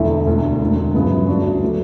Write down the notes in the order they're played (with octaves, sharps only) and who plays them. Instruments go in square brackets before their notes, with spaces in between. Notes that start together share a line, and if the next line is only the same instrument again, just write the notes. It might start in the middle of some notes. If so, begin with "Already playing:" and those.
Already playing: [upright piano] E1 E2 D3 A3 E4
E1 D2 D3
E1 D2 D3
G1 F#2 C#3 E3 B3
D2 C#3 G3 D4 F#4
F#3 B3 E4 A4